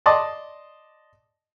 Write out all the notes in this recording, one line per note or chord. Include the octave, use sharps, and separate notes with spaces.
D5 D#5 A5 C6 D6